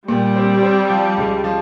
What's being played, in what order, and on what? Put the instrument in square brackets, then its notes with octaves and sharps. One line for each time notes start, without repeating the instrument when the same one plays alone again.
[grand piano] A#2 [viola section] G3
[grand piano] C4
C4
F3
C#2
F3